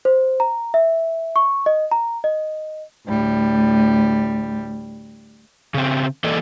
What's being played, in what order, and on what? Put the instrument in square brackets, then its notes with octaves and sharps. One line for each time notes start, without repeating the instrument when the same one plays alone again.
[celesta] C5
A#5
E5
C#6
D#5
A#5
D#5
[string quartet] D2 A2 G3
[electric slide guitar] C#3 C4
E3 A#3 A4 D5 D#5